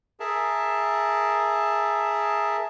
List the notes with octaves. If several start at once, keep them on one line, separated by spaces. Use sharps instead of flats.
G#4 A#4 E5 A5